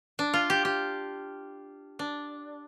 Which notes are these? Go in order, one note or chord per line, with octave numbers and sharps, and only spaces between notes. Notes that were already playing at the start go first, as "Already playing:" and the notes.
D4
F4
G4
G4
D4